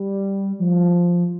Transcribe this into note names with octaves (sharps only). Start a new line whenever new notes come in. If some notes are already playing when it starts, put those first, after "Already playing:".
Already playing: G3
F3